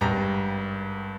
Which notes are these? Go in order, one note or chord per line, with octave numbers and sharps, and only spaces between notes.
G#1 G2 G3 A#5